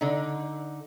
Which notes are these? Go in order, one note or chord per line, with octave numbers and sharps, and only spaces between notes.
D3 D#4